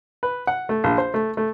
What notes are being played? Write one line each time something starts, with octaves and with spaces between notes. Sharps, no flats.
B4
F#5
A3
A#1
C5
A3
A3